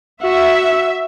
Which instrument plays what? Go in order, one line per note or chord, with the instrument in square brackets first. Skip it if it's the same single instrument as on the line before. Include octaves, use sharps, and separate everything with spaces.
[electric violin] F#4 [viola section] E5